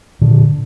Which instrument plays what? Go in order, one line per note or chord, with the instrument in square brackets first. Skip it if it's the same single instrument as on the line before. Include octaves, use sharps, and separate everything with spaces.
[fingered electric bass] A#2 D3